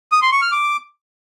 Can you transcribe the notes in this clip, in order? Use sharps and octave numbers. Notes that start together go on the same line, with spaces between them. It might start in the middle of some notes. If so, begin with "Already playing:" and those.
D#6
C6
C#6
F6
D6